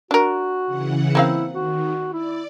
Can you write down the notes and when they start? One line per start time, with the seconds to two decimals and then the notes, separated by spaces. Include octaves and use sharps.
0.11 D4 F#4 A#4
0.66 C#3 E3 F#5
1.15 A#3 C4 E4 F5
1.54 D#3 F#4
2.13 E4 D5